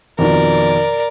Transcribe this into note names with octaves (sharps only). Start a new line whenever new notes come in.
F2 B2 D#3 A#4 D5